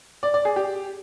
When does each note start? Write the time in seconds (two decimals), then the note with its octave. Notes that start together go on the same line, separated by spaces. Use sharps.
0.23 D5
0.34 D5
0.45 G#4
0.56 G4